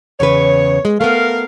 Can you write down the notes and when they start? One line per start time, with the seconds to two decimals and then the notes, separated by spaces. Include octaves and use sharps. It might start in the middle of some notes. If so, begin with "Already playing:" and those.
0.20 E2 C#3 B4 C#5
0.85 G#3
1.01 A3 B3 A#4 F5